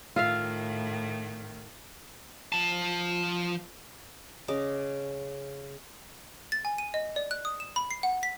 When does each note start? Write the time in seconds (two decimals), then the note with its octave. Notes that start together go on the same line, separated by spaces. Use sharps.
0.16 A2 D#3 F4 E5 F5
2.52 F3 A5
4.48 C#3 D#5 D6
6.52 A6
6.65 G#5
6.78 D#7
6.94 D#5
7.16 D5
7.31 F#6
7.45 D#6
7.60 E7
7.76 B5
7.91 C7
8.03 F#5
8.23 B6